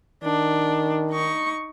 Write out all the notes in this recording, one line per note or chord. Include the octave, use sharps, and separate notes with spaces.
D#3 D4
D#4 C#6